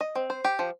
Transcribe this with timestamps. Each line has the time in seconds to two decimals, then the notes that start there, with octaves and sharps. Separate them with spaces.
0.01 D#5
0.15 C4
0.30 C5
0.45 G4
0.59 F3